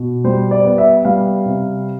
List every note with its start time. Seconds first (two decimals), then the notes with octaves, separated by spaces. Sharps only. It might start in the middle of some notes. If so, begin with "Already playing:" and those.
Already playing: B2
0.24 G3 C5
0.51 D5
0.64 B3
0.78 E5
1.05 G3 F5
1.46 C3